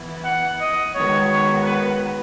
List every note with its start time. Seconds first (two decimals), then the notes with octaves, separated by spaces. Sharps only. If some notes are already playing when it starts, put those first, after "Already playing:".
Already playing: E3 B3 E4
0.25 F#5
0.60 D#5
0.95 D#3 G#3 B3 F#4 C#5
1.30 C#5
1.65 B4